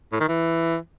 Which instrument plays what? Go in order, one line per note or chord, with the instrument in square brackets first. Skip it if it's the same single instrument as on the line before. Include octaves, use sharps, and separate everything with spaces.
[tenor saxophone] A2
D#3
E3